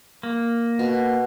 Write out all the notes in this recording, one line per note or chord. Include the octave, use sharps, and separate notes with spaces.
A#3
B2